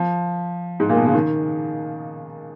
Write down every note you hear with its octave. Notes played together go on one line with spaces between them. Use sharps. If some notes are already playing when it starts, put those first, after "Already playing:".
Already playing: F3
G#2
A#2
B2
C#3
D#3